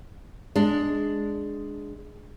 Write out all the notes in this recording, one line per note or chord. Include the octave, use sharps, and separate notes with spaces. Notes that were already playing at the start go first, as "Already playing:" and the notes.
G#3 D4